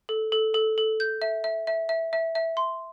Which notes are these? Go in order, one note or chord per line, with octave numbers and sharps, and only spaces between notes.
A4
A4
A4
A4
G6
E5
E5
E5
E5
E5
E5
C6